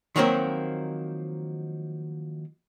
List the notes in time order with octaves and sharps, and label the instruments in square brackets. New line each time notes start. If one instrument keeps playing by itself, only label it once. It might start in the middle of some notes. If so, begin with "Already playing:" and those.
[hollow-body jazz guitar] D#3 F3 F#3 A#3 C4 A#4